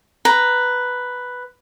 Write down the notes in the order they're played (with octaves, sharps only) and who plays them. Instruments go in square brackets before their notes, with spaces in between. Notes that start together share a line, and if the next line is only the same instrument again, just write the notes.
[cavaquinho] B4 A#5